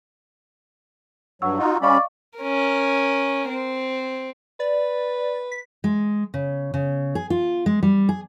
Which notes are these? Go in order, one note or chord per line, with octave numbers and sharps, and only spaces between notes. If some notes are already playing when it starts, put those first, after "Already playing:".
G2 F#3 F#5 C#6 E6
D#4 F4 F#4
G3 C#4 D5 D#5 F5 B5 C#6
C#4 A#4
C4
B4 D5
B6
G#3
C#3
C#3
G#4
F4
G#3
G3
G#4